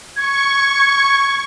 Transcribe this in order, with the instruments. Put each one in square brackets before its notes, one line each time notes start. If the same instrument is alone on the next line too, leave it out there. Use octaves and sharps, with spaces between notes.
[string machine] C#6 [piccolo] G#6